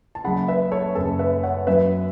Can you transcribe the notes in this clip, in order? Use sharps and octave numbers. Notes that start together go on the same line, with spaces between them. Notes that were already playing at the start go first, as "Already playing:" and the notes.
A5
F#1 F#2 C#3 F#5 B5
B4 E5
A4 C#5
F#1 F#2 C#3 A4
B4 E5
C#5 F#5
F#2 F#3 B3 B4 E5